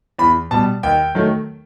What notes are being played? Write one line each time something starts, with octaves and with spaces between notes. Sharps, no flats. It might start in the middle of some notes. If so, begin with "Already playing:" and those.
E2 B5
B2 G3 A5
D#2 G5
D#3 F#3 A3